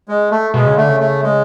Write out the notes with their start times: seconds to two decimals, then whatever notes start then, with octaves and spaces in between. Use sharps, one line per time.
0.08 G#3
0.31 A3
0.54 B2 G#3
0.66 C#3
0.77 D3 A3
0.88 C#3
1.00 A3
1.23 G#3